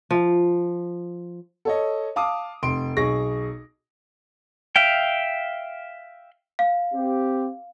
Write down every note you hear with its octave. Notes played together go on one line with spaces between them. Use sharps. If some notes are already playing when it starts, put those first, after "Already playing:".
F3
A4 C#5 D#5
F5 A5 D6 D#6
F1 C6 D7
B1 G#4 C#6 A#6
E5 F5 G5
F5
C4 G4